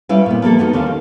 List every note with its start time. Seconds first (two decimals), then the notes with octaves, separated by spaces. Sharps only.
0.09 G3 C#4 E4 B4 F5
0.26 A#2 B3
0.42 F3 G3 A#3 B3 A4
0.59 B3 D#4 F#4
0.73 D#2 D3 D#3 C#4 F5
0.86 D#3